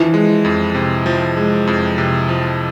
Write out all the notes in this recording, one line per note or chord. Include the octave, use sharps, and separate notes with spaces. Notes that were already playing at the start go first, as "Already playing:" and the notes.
Already playing: E3 F3
G#3
F2
C3
F3
G#3
F2
C3
F3